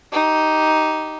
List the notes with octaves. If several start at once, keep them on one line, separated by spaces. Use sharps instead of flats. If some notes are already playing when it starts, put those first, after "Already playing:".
D#4 G4